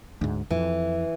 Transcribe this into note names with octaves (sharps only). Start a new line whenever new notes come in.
D2 G#2
F2 E3